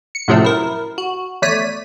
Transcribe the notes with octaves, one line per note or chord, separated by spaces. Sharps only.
C#7
F#2 A2 C3 F3 F#3 A3
E4 A#4
F#4
E2 A3 C#5 D5 B6 D#7